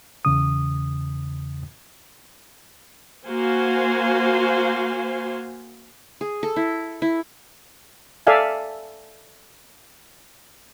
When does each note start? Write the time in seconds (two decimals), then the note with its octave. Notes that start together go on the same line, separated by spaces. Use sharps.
0.25 E2 C#3 D#6
3.27 A#3 F#4 C5 F5 G#5
6.21 G#4
6.43 A4
6.56 E4
7.02 E4
8.27 A4 D5 E5 F5 G#5